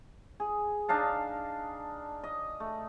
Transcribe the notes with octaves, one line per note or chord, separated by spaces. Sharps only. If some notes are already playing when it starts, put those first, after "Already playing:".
G#4
D4 D#4 F5 A5
D#5
A3